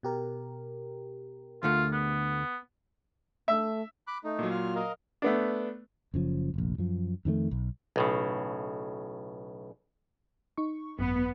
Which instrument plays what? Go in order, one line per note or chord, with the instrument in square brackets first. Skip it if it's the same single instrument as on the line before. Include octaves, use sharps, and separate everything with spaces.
[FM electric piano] B2 G4 A#4
[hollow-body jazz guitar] D2 D3 A3 [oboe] F4
[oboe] B3
[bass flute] A3 [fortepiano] E5
[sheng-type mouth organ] B5 D6 F#6
A3 D#4
[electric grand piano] A#2 F#3
[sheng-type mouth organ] F4 F6
A#4 D#5 F5
[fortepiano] A3 B3 D4
[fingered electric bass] F#1 C#3 F3
F1 A#1
F#2 F3
F2 D#3 E3 A3
B1
[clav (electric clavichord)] B1 A2 C#3
[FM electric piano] D#4 C#6
[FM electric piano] G#1 F#2 [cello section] B3